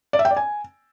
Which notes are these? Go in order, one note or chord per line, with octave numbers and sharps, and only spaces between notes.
D5
E5
G5
D5
G#5